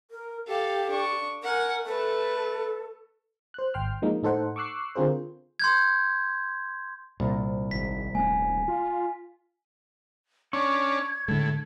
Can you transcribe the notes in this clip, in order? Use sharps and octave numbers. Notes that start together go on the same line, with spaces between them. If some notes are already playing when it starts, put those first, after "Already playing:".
A#4
G4 A4 F5
D4 C#6
A#4 F#5 G#5
A3 A4 B4
C5 F#6
G#1 G5 C6 F6
F3 G#3 A#3 D#4
A2 D#4 A4 C5 F#5
C#6 D6 E6 F#6 C7
D3 C4 F4 G#4 A#4 C5
C6 G6 G#6
C2 A#2
G#1 B6
D#1 A3 C4 G#5
F4
C#4 D4 C#6 G#6
A2 D3 G#3